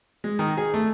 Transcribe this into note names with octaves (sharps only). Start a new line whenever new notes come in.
G#3
D#3
G#4
A3